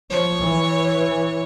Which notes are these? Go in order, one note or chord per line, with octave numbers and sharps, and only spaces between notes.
F3 C#5
E3